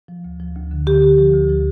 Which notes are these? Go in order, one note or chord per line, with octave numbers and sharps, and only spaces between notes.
F3
D2
F3
D2
D3
D3 G4
D3
F3
D2
F3